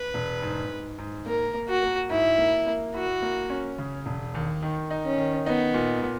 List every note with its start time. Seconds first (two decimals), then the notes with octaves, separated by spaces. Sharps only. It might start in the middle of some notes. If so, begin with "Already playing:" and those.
Already playing: B4
0.14 E1
0.42 G#2
0.71 G#2
0.98 G#2
1.26 A#3 A#4
1.54 A#3
1.68 F#4
1.83 A#3
2.10 G#2 E4
2.38 A#3
2.66 A#3
2.94 E4 F#4
3.22 A#3
3.50 C#4
3.78 C#3
4.06 E1
4.35 D#2
4.63 D#3
4.90 D#4
5.04 C#4
5.18 D#3
5.46 B3 D#4
5.74 A#2
6.02 A#2